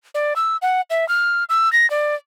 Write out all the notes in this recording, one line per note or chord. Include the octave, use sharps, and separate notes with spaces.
D5
E6
F#5
E5
F6
E6
A#6
D5